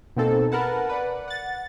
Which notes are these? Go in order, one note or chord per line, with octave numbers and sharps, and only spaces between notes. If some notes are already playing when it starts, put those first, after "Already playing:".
B2 A#3 C4 D#4 A4
A#4 B4 F#5 A5
B4 D5 F#5
F#5 A6